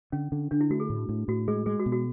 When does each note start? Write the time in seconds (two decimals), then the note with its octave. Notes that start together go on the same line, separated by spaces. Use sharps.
0.12 D3 C#4
0.32 D3
0.51 D3 D4
0.61 E4
0.70 A3 F#4
0.80 G#4
0.90 A2
1.09 A2
1.28 A2 F#4
1.48 G#3 G#4
1.66 G#3 G#4
1.80 F#4
1.86 B2
1.92 F#4